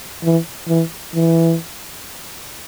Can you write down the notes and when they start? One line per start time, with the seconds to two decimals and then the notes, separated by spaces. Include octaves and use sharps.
0.23 E3
0.68 E3
1.14 E3